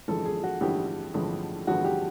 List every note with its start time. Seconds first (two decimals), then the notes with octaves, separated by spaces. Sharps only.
0.08 A1 G2 D3 F3 G#3 A4
0.25 G#4
0.44 F#4
0.61 A1 G2 D3 F3 G#3 G4
1.14 A1 G2 D3 F3 G#3
1.67 A1 G2 D3 F3 G#3 F#4
1.85 G4